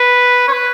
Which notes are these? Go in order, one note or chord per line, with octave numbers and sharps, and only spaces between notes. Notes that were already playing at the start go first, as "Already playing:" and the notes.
Already playing: B4
C#5
B4